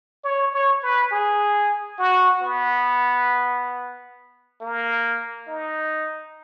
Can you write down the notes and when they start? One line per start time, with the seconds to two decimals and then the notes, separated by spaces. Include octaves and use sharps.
0.24 C#5
0.53 C#5
0.82 B4
1.11 G#4
1.99 F#4
2.42 B3
4.61 A#3
5.47 D#4